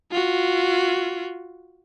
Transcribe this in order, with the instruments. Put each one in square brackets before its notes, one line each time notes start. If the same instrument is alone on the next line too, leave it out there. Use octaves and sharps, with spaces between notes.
[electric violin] F4 F#4